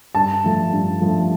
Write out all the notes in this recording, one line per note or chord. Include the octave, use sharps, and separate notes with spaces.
G2 A5
F3 A3
G2
F3 A3